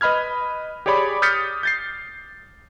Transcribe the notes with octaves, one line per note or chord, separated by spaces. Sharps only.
B4 D#5 B5 F6 G#6
G4 G#4 C#5 D5 B5 D6
D#6 F6 G6 A6 B6 C#7
G6 A6 C7